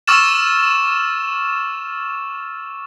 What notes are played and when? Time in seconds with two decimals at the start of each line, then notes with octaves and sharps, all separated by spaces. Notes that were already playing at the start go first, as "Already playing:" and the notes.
0.08 C#6 D6 E6 F6 A6 E7